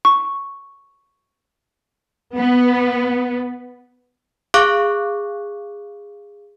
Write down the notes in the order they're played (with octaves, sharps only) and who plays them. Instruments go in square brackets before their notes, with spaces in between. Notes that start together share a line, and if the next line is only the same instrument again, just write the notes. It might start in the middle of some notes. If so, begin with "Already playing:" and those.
[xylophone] C#6
[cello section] B3
[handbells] G#4 F5 C#6 D6 F#6